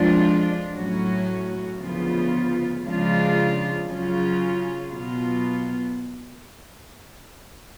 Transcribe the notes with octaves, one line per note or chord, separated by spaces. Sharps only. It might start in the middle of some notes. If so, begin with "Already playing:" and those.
Already playing: F2 F3 G#3 D4 F4
A2 F#3 C#4 F#4
D2 C#3 F3 B3 F4
C#3 F3 G#3 D4 F4
C#3 F#3 C#4 F4
B2 F#3 B3 F4